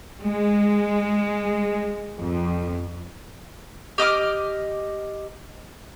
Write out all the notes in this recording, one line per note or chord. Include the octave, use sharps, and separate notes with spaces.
G#3
F2
G4 D#5 D6 F6